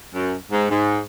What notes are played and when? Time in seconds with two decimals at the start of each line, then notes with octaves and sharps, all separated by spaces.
0.14 F#2
0.51 G#2
0.70 G#2